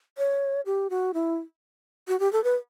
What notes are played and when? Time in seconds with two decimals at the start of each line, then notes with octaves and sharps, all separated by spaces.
0.18 C#5
0.66 G4
0.90 F#4
1.14 E4
2.08 F#4
2.20 G4
2.33 A4
2.44 B4